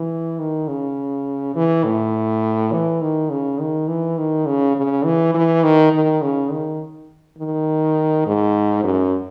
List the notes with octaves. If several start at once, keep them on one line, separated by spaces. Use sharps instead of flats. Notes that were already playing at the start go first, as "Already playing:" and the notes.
Already playing: E3
D#3
C#3
E3
A2
E3
D#3
C#3
D#3
E3
D#3
C#3
C#3
E3
E3
D#3
D#3
C#3
D#3
D#3
G#2
F#2